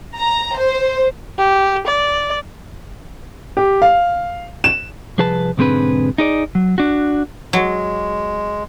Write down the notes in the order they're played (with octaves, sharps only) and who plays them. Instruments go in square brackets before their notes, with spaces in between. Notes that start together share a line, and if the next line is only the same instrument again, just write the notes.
[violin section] A#5
C5
[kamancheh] G4
D5
[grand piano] G4
F5
E7
[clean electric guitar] C2 F3 G#4 B4 A5
B1 G#2 D3 C4 G#4 B4
D#4 G#4 D5
F#3
D4 F#4
[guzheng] F#3 [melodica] G#3